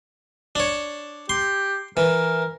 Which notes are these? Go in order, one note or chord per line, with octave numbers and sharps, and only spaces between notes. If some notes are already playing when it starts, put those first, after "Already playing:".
D4 C#5
G4 C6
E3 A#4